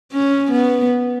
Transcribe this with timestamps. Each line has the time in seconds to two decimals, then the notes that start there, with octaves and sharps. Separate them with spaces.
0.13 C#4
0.52 B3